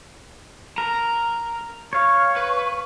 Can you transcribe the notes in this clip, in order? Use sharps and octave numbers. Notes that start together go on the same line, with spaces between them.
A#4 A#5
C#5 F5 C#6
B4